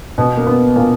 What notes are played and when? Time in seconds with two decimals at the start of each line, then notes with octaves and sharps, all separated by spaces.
0.18 B2 B3
0.37 A#3
0.46 B2 B3
0.76 A#2 A#3